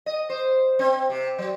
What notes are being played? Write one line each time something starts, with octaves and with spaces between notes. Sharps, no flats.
D#5
C5
C4
C3
F#3